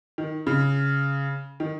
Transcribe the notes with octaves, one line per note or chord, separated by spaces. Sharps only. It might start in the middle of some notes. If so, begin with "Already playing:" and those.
D#3
C#3
D#3